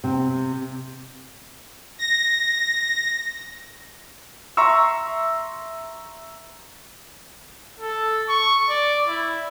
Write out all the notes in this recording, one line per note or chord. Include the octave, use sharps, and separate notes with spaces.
C3
A#6
E5 A#5 C6 C#6 E6
A4
C#6
D5
E4